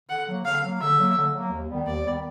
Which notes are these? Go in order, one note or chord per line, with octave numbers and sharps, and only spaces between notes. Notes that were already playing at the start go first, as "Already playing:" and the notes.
D3 F#5
F#3 A#3
D3 F5
F#3 A#3
D3 E5
F#3 A#3
D3
F#3 A#3
D#2
D#3 G3 B3
D#2 D5
D#3 G3 B3